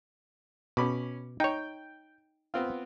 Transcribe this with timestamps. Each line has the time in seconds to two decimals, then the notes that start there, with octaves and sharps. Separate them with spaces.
0.77 B2 C#4 B5 D6
1.40 D#4 C#5 G5
2.54 B3 C4 F4